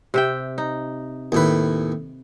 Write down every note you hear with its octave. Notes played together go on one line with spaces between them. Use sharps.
C3 E5 G5
D#4
D#2 A2 B4